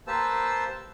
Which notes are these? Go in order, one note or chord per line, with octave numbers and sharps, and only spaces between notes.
A#3 G4 B4 C5 A5 E6